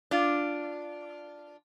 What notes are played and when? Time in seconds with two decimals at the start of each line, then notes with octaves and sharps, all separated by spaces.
0.11 D4 F4